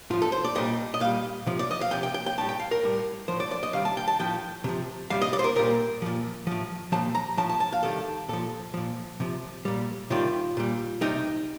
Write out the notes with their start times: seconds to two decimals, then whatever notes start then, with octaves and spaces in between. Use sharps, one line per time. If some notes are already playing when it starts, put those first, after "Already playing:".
0.10 A2 F3 F4
0.22 A4
0.32 C5
0.44 D5
0.55 A#2 G3 D#5
0.94 D#5
1.00 A#2 G3 F5
1.47 C3 F3
1.59 D5
1.71 D#5
1.81 F5
1.91 C3 F3 G5
2.03 G5
2.14 G5
2.26 G5
2.38 A2 G3 A5
2.49 G5
2.60 F5
2.71 A#4
2.83 A2 G3
3.28 A2 F3 C5
3.40 D5
3.51 D5
3.63 D#5
3.73 C3 D#3 G3 F5
3.85 A5
3.97 G5
4.08 A5
4.20 A2 F3 G5
4.64 C3 F3
5.10 C3 D#3 G3 F5
5.22 D#5
5.33 D5
5.39 C5
5.44 A#4
5.56 A#2 G3 A#4
6.02 A#2 F3
6.47 A2 F3
6.92 A#2 F3 A5
7.15 A#5
7.37 A2 F3 A5
7.49 A5
7.60 A5
7.72 F5
7.83 C3 D#3 G3 A4
8.29 A#2 F3 A4
8.74 A#2 F3
9.20 C3 F3
9.65 A#2 G3
10.10 C3 D#3 G3 F4
10.57 A#2 G3
11.01 C3 G3 D#4